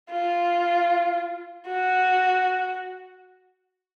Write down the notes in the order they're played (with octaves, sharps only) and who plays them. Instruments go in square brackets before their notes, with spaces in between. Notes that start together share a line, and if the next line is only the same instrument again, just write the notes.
[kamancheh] F4
F#4